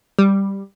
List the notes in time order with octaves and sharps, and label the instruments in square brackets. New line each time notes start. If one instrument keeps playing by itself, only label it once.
[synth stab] G3